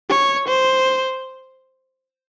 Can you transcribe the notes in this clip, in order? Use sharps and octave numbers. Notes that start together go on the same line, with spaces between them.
C#5
C5